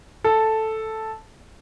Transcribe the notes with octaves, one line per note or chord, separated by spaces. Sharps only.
A4